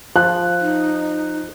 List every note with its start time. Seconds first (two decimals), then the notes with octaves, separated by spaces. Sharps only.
0.16 F3 F#6
0.59 D#4